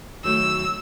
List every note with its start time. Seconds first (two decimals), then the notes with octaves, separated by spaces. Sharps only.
0.24 D#3 F#3 A3 E6